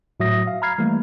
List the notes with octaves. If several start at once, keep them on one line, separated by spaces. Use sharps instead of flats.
A2 F#3 F#4 E5 D#6 A#6
F5
A#5 B5 F6 G#6 C7
E3 G3 A3 A#3